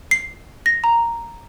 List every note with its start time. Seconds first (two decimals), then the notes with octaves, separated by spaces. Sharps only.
0.11 C7
0.66 A#6
0.84 A#5